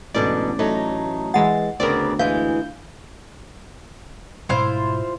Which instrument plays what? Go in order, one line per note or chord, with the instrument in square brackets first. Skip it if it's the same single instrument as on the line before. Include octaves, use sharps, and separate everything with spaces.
[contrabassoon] A1 [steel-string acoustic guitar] G#2 B2 D3 [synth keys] D5
[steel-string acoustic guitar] F#3 A3 D#4
[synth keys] E3 G#3 A6 [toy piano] F#5
[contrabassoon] D2 [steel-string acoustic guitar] C#3 B3 C4 [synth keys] A#4 D5
[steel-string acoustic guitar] E3 G#3 [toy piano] F5 [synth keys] G6
[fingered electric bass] G#2 B2 G3 [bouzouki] E4 F4 C5